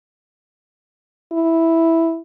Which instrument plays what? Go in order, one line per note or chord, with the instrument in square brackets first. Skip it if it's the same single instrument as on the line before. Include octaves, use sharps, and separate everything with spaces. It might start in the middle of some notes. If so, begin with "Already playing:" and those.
[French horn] E4